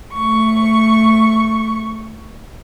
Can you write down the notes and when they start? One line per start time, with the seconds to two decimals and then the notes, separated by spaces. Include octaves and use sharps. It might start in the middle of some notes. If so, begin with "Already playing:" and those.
0.14 A3 C#6